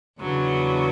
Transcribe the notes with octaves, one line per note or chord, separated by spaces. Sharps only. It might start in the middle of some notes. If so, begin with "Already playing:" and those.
E2 C#3 F#3 B3 D4